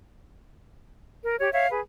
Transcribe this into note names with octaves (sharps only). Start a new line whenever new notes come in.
A#4
G4 C#5
C#5 E5 F5
G#4 B4